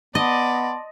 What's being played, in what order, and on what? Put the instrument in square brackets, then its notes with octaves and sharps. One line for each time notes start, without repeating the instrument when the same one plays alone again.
[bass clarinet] B3 [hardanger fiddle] D5 [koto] D#5 [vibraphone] A5 C6